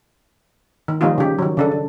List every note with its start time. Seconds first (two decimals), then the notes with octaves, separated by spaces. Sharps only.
0.88 D#3
1.01 D#3 F3 G3 A#3 D#4 F4
1.18 C#3 G4
1.39 D#3 F#3
1.57 C#3 D4 A4
1.72 A4